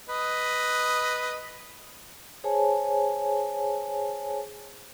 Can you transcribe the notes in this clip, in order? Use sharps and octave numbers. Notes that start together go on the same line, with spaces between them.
B4 D#5
G#4 C5 C#5 G#5 A5